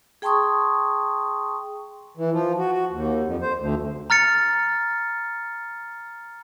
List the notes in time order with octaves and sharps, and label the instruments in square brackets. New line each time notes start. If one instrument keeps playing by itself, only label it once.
[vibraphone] G#4 G5 A5 C6 C#6 D#6
[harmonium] E3
F3
F#4
F#4
D#2
F2
C5
D2
[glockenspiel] A#5 F6 A6 C#7